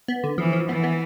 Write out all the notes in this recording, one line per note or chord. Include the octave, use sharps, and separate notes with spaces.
B3
D3
E3 F3
F3
E3 B3
B3